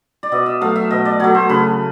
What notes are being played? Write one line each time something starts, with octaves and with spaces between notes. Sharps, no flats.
D5
B2 D#5
E5
F#3 A3 F5
E5
B2 D#5
D5
F#3 A3 C#5
C5
C#3 B4